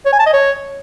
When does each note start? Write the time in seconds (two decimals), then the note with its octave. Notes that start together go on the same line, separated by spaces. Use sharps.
0.06 C#5
0.13 G#5
0.19 A5
0.26 D#5
0.33 C#5